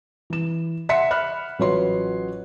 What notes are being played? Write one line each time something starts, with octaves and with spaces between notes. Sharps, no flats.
E3 E7
E5 F#5 C6 B6 C#7
E5 B5 F6 F#6
A1 F#3 F4 B4 C#5 C6